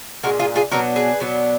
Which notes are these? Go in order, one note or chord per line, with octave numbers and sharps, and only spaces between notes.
A#2 G#3 D4 F#4 A#4
F4 G#4
F4 G#4
B2 F#3 B3 D4 F#4 A#4
G#4 B4
B2 F#3 B3 D4